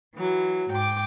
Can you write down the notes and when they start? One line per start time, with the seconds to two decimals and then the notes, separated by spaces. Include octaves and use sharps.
0.16 E3 F#3
0.71 G#2 G5 D6